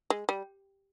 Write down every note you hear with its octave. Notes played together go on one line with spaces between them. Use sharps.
G#3
G3